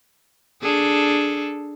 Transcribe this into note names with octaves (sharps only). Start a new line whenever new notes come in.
D4 G#4 A4